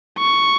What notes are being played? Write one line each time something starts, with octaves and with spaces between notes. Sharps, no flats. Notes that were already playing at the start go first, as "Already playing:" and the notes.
C#6